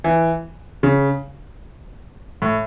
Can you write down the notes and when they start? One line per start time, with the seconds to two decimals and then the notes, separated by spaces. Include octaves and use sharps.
0.04 E3
0.83 C#3
2.42 A2